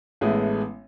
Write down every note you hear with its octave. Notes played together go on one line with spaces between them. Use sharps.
A1 G#3 A3 B3 D#6